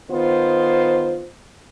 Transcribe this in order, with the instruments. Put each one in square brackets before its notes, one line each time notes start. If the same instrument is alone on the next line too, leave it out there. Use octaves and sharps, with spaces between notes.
[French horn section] D#3 B3 F4 C5